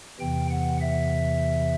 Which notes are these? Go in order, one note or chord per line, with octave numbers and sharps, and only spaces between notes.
E2 C3 E3 G5
F#5
E5